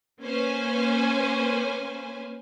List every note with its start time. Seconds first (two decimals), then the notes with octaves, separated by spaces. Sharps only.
0.21 A#3 C#4 B4 C5 G#5